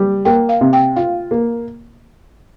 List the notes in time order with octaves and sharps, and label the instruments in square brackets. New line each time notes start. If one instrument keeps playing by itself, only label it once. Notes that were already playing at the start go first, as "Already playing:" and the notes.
Already playing: [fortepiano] G3
[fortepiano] A#3 [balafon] G5
[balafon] F5
[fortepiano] C3
[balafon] G5
[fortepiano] F4 [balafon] F5
[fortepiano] A#3